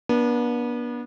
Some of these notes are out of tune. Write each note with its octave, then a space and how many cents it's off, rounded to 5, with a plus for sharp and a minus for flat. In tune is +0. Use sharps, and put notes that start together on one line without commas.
B3 -40 D4 -5